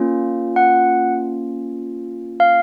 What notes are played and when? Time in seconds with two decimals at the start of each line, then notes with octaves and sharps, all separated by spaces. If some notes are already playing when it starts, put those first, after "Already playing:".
Already playing: A#3 C#4 F4
0.56 F#5
2.40 F5